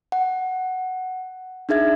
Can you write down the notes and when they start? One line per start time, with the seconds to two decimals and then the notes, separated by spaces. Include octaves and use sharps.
0.12 F#5
1.69 D4 D#4 G#4 E5 G#6